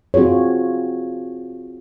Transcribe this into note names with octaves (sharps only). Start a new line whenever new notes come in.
C4 F4 F#4 G#4 C#5